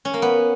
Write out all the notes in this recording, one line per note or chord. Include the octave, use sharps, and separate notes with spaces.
C#4
A#3
B3